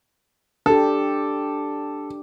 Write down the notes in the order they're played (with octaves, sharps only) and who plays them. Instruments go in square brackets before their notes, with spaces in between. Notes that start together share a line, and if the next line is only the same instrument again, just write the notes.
[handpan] D4 G4 [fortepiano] A4